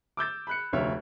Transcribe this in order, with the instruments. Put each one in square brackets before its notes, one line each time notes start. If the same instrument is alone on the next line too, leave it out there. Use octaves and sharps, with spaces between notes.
[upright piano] D6 E6 G6 A6
B5 F#6 C#7
F1 D2 C#5 E5 F5 F6